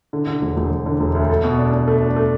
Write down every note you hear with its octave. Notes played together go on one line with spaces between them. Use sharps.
D3
D3
E1
E1
E1
D3
E1
D2
A4
B2
D4
D4
A3
D4
A3